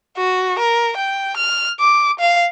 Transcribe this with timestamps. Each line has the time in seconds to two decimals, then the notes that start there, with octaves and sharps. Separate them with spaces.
0.17 F#4
0.59 A#4
0.97 G5
1.37 F6
1.80 D6
2.19 F5